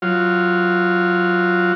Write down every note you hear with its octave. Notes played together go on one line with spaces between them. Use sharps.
F#3 F4